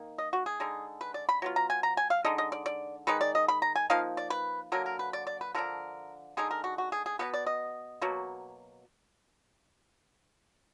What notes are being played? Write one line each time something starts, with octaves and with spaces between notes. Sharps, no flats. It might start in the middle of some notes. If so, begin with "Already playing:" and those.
Already playing: D#3 A#3 D#4
D#5
F#4
G#4
D3 G#3 D#4
B4
D5
B5
F#3 B3 F4
A#5
G#5
A#5
G#5
F5
D3 G#3 D#4 D#5
D#5
D5
D5
D#3 G#3 D#4 B4
D5
D#5
B5
A#5
G#5
F3 A#3 D#4 F5
D5
B4
D3 F#3 A#3 A#4
A#4
B4
D5
D5
B4
D3 F3 B3 D4 A#4
D3 G#3 D#4 G#4
A#4
F#4
F#4
G#4
G#4
B2 G#3 B3 B4
D5
D#5
B2 F#3 A#3